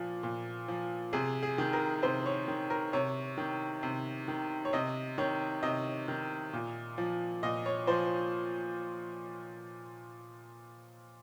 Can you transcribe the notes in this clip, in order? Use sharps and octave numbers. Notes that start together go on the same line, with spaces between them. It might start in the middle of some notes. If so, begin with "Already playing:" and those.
Already playing: A#2 F3
A#2
F3
C3 G#4
G#4
D#3
A#4
C3 C5
C#5
D#3
A#4
C3 C#5
D#3
C3
D#3
C#5
C3 D#5
D#3 C#5
C3 D#5
D#3
A#2
F3
A#2 D#5
C#5
F3 C5